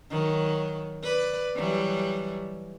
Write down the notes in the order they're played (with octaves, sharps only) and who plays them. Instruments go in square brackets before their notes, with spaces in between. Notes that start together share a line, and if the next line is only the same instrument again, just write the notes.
[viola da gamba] D#3 F#3
B4 D5
E3 F#3 G3